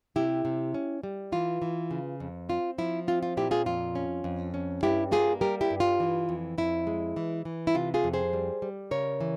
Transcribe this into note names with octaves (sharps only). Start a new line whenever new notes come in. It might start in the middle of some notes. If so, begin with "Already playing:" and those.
C3 E4 G4
C3
C#4
G3
E3 F4
E3
C#3
F2
C4 F4
F3 E4
C4 F4
F4
A#2 E4 G4
F4 G#4
F2 F4
C#4
F2
C#4
G2 E4 G4
A#3 F4 G#4
G3 G4 A#4
E4 G4
G2
F4
E3
F2
F2 E4
G#3
E3
E3
E4
C3 F4
F4 G#4
F2
G#4 C5
G3
G3
C#3 A#4 C#5
E3